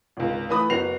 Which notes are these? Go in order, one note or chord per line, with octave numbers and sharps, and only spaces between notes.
G#1 C#2
E3 A3 B4 B5 D#6
F#1 B3 F#4 C7 F7